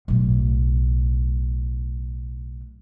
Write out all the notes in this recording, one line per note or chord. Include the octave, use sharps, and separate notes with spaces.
B1 A2